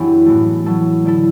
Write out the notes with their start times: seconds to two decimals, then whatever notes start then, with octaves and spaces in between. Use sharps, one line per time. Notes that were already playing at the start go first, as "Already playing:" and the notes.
Already playing: F#2 E3 B3 D4 E4 G4
0.26 A2 E3 A3
0.65 F#3 A3 E4 A4
1.05 D3 A3 E4 A4